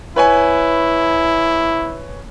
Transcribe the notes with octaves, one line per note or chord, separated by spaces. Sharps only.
E4 B4 C#5 G#5